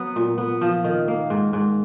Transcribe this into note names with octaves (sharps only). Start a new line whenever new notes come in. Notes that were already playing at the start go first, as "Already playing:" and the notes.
Already playing: F#3 B3
A#2
B3
F3
D#3
A#3
G#2
G#2